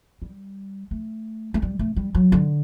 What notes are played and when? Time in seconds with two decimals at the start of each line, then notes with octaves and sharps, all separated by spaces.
0.22 G3
0.91 A3
1.54 A3
1.62 G3
1.79 A3
1.96 G3
2.15 F#3
2.32 D3